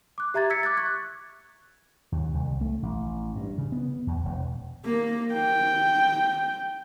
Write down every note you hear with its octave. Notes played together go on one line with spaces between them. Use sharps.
D6 F#6
G4 E5 A#5 G#6 A6
E6 G#6 B6 C#7
D6 F#6 G#6 A6
C#6 F#6 G#6
D#2
C2
A3
A1
G2
C#3
B3
E2
E1
A#3
G5